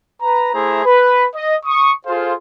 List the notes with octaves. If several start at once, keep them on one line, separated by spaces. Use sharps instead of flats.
B4 A#5
A3 E4 G#4 C5 A#5
B4
D#5
C#6 D#6
F4 G#4 A4 C5 F5